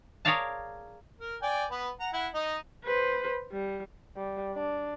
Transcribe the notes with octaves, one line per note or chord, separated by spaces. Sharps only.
G#4 A#4 C#5 D5 F5 A5
A#4
D5 G5 G#5
B3 B4
F#5 A#5
E4 F#5
D#4 D#5
B4 C5
G3
G3
D4